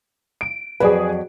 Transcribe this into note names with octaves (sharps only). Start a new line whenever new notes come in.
D7
F2 F#3 G#4 B4 D5